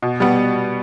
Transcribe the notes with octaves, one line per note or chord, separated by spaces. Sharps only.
B2
G3 B3